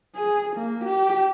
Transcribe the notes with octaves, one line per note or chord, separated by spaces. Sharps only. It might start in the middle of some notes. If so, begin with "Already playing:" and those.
G#4
A#3
G4